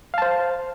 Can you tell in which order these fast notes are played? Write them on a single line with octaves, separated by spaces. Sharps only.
F5 A5 C5